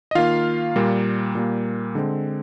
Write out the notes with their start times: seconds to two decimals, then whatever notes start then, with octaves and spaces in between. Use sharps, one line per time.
0.11 D#5
0.15 D#3 A#3 F4 F5
0.76 A#2 G3 A#3
1.35 A#2 G3 A#3
1.95 D3 G#3 C4